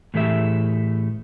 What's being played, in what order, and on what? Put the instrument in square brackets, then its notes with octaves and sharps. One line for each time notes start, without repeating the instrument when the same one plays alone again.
[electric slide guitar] A2 E3 A3 G4 G#4 E5